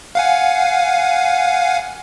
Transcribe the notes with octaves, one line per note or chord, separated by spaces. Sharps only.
F5 F#5 G#5